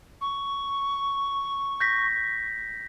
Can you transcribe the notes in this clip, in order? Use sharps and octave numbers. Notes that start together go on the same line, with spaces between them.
C#6
G6 A#6 B6